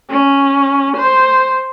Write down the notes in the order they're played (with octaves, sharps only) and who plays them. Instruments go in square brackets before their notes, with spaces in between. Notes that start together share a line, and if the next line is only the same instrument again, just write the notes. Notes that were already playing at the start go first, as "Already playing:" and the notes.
[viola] C#4
C5